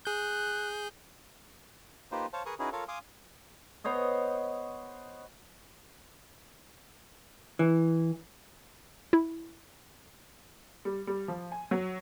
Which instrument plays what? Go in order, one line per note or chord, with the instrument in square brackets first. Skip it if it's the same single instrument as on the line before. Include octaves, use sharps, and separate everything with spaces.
[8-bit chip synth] G#4 G6 [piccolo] F#6
[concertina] A#3 D#4 F4 G4 B4 C5
C5 C#5 F5 A5
G#4 A#4 B4 C#6 D#6
C#4 D#4 E4 F#4 G#4 B4
F4 A4 A#4 C#5 F5
F5 G#5 C6 D6 D#6
[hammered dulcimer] B3 C5 C#5 D#5
[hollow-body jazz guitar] E3
[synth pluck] E4
[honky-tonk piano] G3
G3
F3
G#5
F#3